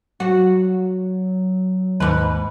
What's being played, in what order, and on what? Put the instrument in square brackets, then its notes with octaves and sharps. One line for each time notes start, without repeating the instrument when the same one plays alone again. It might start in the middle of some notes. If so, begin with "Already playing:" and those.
[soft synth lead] F#3 [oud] F#4
[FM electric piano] D#2 [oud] G#2 B4